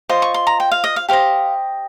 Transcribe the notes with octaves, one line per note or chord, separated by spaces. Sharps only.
F4 C5 D#5 C6
C#6
C6
A#5
G5
F5
D#5
F5
G4 C5 D#5 F5